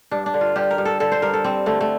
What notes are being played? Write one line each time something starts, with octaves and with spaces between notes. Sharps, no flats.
G2 D4
D4
D3
F4
G2 G4
A#4
G2
A4
D3 A4
C5
G2 A#4
A4
G3 C4
D3 A3
A3